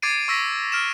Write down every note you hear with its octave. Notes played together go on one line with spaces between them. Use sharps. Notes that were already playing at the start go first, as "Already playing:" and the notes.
D6 G#6 A6 C7 D7 D#7
C#6 E6 A#6 B6
F6 D7 E7